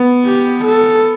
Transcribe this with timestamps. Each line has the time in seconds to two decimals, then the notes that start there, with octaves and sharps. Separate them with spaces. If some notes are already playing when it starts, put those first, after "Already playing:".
Already playing: B3
0.26 G4
0.65 A4